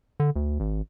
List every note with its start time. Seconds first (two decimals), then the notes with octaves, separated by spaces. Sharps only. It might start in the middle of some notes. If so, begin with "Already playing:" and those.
0.20 D3
0.36 D2
0.60 G#1